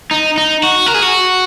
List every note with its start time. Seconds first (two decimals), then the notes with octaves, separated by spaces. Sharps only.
0.11 D#4
0.38 D#4
0.63 F#4
0.86 A#4
0.94 G#4
1.02 F#4